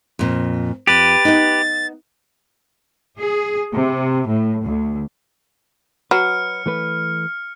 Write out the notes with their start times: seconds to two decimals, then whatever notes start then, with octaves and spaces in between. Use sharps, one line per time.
0.19 F2 A#2
0.87 F2 G4 B4 A6
1.25 B3 D#4
3.19 G#4
3.74 C3
4.28 A2
4.65 D2
6.11 F#3 B4 F6 C#7
6.66 E3 A3 B4